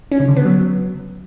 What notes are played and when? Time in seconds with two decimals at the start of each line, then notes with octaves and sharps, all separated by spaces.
0.12 C#4
0.20 C#3
0.28 D3
0.37 B3
0.45 F#3